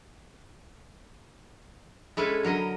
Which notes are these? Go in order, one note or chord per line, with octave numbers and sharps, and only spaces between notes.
G#3 C#4 E4 A4 B4
D3 F#3 A#4 D#5